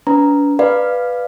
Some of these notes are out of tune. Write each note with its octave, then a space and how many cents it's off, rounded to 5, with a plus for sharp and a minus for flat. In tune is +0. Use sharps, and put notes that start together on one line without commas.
D4 -45 B4 +0 A#5 +0
B4 +0 D5 +20 F5 +0